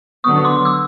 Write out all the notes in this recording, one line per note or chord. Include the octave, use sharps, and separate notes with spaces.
D3 F#3 B3 C#6 D#6
C6 D6
D6 E6